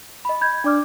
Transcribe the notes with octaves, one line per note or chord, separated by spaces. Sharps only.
D#5 B5
B5 G6 G#6
D4 D5 D6 F6